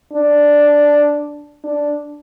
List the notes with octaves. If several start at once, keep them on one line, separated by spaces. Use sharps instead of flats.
D4
D4